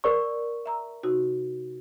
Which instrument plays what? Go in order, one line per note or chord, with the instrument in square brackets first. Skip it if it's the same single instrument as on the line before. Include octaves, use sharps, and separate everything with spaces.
[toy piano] A#4 D5 C#6
[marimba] E5 A#5 E6
C3 D#4 F#4